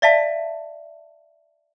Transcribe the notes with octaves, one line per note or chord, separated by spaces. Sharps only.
D5 E5 F5 A5